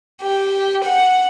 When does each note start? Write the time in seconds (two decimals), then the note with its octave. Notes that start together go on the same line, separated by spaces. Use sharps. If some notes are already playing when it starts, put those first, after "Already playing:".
0.22 G4
0.85 F#5